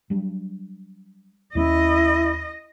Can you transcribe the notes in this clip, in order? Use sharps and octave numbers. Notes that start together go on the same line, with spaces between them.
F#3 G3 D4
D#2 G#3 C#4 E4 D#5